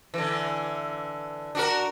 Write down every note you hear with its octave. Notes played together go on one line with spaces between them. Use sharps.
D3 E3
D4 F#4 A#4